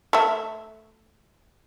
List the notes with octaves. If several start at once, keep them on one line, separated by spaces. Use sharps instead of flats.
A3 E5